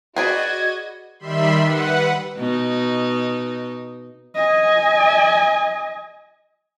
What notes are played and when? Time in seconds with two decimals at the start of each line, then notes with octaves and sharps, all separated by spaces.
0.16 F#4 G#4 B4 D5 D#5 G#6
1.19 D#3 G3 E5 B5 C6
1.62 B4 F#5
2.38 B2 D#4
4.35 D#5 G#5